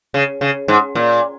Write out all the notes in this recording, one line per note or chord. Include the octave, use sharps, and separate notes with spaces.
C#3
C#3
G#2
A#2